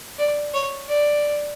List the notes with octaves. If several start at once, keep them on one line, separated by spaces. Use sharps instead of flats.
D5
C#5
D5